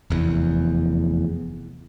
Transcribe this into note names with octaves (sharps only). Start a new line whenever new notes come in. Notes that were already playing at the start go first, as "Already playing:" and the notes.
F1 E2